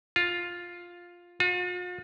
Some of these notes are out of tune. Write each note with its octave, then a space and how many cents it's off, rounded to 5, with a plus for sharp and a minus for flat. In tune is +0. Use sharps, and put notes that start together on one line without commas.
F4 +5
F4 +45